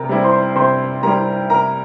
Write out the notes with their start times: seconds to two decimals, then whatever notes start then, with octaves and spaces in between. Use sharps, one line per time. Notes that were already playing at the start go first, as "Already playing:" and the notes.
Already playing: C3 A#4 A#5
0.09 G3 C4 E4 G4
0.24 C5 C6
0.56 C3 C5 C6
1.03 G3 C4 E4 G4 A#4 A#5
1.50 C3 A#4 A#5